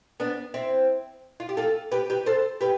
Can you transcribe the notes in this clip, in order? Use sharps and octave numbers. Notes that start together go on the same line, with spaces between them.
B3 D4
C4 E4
F4
G4
F4 A4
G4 B4
G4 B4
A4 C5
G4 B4